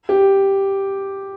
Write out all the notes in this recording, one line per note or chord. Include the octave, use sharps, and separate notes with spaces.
G4